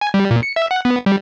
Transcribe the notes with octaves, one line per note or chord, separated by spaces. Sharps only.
G#5
G3
A#2
C#7
E5
F#5
B3
G3